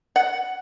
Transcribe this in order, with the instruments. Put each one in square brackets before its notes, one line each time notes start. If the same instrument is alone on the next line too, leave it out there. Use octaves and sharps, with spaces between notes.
[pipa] F#5